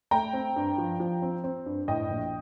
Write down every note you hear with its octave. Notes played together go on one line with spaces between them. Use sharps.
A3 G5 A#5
C4
G2
F3
F3
C4
C4
G2
A2 D#5 G5
A#1